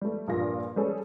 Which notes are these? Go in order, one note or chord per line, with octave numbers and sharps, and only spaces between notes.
G3 A3
A#1 G2 A#2 F4 A#6
G3 C#4 G#4 A4